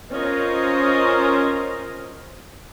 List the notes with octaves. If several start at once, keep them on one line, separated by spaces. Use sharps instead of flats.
C#4 F4 A#4 C5 D#5